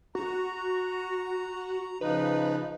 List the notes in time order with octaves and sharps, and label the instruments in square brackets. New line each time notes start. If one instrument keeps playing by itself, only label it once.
[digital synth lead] F#4 [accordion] A#5
[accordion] C#3 F3 D#4 [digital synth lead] B4